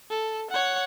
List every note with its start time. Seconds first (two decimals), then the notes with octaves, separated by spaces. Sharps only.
0.10 A4
0.50 C#5 F#5